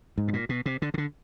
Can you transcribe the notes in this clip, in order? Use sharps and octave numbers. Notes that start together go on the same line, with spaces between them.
G#2
A2
A#2
B2
C3
D3
C#3
D3